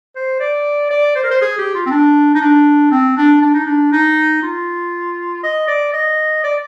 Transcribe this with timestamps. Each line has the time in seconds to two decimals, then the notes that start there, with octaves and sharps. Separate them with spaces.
0.16 C5
0.40 D5
0.91 D5
1.16 C5
1.24 A#4
1.31 C5
1.42 G#4
1.58 G4
1.75 F4
1.86 C4
1.91 D4
2.35 D#4
2.41 D4
2.91 C4
3.17 D4
3.42 D4
3.54 D#4
3.66 D4
3.92 D#4
4.43 F4
5.44 D#5
5.68 D5
5.93 D#5
6.44 D5